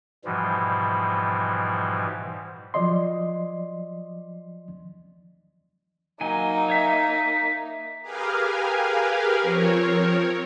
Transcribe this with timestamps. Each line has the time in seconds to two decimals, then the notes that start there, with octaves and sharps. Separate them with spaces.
0.25 G#2 B2 E3 F3 G3
2.74 F3 F#3 D5 D#5 C6
6.21 F#3 A#3 D#4 G#5
6.70 C#5 E5
8.02 G4 G#4 A#4 B4 F5 G#5
9.41 F3 C4 A#4 C#5